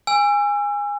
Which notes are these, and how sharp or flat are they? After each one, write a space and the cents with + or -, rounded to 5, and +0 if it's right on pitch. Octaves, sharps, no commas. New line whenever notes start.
G#5 -20 E6 +30